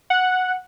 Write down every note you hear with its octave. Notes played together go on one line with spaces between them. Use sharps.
F#5